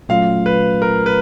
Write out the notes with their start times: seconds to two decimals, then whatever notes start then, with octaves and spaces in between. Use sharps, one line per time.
0.09 A#2 F#3 A3 C#4 F4 F5
0.46 B4
0.82 A#4
1.06 B4